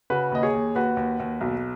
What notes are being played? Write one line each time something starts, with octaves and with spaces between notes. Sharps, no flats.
C#3 F#4 B4
D#2 D#5
G#4 C#5
D#2
D#2 F#4 B4
D#2
D#2
B1